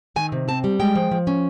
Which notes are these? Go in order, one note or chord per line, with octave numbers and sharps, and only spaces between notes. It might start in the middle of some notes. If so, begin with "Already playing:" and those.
D#3 G#5
C3
C4 A5
G3
G#3 G5
F3
F3
C#4